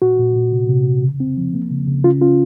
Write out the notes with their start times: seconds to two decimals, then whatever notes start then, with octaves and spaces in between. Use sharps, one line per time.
0.02 A#2 F#4
0.19 A#2
0.35 A#2
0.52 C3
0.69 C3
0.86 C3
1.03 C#3
1.20 C4
1.37 F3
1.54 A#3
1.71 C#3
1.88 C#3
2.04 C#4 F4
2.21 C#4 F4